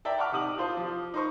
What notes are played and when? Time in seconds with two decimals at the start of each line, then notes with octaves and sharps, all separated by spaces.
0.05 D5 E5 G5 A#5
0.18 F#5 A5 C#6 D6 F6
0.32 C3 D#4 D#6 F#7
0.58 F4 C5 F5 A5
0.77 F3
1.14 D#4 C5 C#6